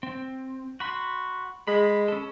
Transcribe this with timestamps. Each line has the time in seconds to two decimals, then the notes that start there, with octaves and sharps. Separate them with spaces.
0.03 C4
0.80 F#4 B5 C6
1.67 G#3 B5
2.08 C#4 A4